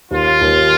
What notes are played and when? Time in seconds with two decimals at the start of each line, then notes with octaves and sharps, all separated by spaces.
0.11 D#2 F4
0.41 D#2